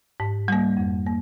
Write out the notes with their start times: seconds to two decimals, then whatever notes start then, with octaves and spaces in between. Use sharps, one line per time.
0.20 G#2
0.48 G3 A#3
0.77 F2
1.06 A#3